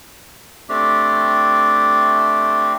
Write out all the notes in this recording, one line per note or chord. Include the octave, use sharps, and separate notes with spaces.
A3 C4 D4 G4